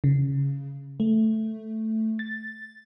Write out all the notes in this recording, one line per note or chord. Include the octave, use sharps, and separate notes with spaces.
C#3
A3
A6